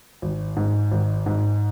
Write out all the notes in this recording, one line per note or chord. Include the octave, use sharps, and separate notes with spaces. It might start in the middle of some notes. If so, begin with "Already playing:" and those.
G#1
G#2
G#1
G#2